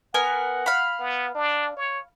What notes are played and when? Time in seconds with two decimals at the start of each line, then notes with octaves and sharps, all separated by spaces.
0.14 B3 A#4 F#5 G#5
0.66 F5 B5
0.99 B3
1.35 D4
1.77 C#5